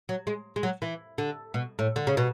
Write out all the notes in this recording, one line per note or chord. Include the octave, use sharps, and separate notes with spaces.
F#3
G#3
G#3
F#3
E3
D3
B2
A2
D3
C#3
B2